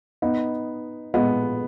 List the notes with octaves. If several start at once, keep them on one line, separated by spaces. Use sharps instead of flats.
B3 D#4
G#3 B3